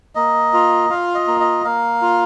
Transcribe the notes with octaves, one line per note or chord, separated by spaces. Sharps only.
A#3 D#5
F4
F4 F5
D#5
A#3
D#5
A#3 F5
F4